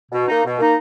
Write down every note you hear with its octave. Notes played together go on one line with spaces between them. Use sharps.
B2
A#3 D#4
B2
A#3 D#4